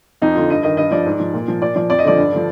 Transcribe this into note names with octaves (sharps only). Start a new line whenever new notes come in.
F2 D#4
D3 F3 F4
G2 D#5
D#3 D#5
G2 D#5
F3 D5
G#2
F3
A#2
F3
A#2 D5
F3 D5
F2 D5
D#5
D3 F3 D5
G2
D3 F3